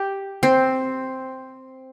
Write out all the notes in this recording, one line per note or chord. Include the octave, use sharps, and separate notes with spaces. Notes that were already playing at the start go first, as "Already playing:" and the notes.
Already playing: G4
C4